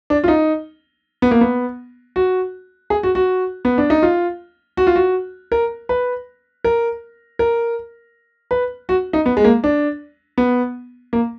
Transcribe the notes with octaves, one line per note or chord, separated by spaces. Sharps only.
D4
F4
D#4
B3
A#3
B3
F#4
G#4
F#4
F#4
B3
D4
D#4
F4
F#4
F4
F#4
A#4
B4
A#4
A#4
B4
F#4
D#4
B3
G#3
A#3
D4
B3
A#3